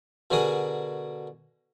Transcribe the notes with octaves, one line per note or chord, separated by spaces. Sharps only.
B2 D3 F#4 G#4 A#4 D#6